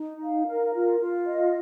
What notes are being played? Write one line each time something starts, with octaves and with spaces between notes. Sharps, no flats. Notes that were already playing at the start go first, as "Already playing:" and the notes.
Already playing: D#4
F5
A#4
F4
F4
D#5